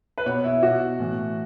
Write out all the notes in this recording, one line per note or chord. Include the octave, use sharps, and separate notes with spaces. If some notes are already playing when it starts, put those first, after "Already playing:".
B4
B2 C#5
E4
B2 F#4
A2 E3